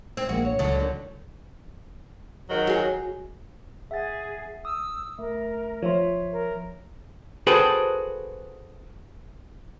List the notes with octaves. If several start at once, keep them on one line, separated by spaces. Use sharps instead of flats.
C4
A#1 G#3 A#3 F#4
C#5
C#2 D3 F#3
D#3 C#4
G#2 D#3 F#3
F#4 G#4
G#4 E5 F#5 A6
D#6 E6
A3 A#4
F3 C#5 E5 C6
A#4
F#4 G#4 A4 B4 C5 G5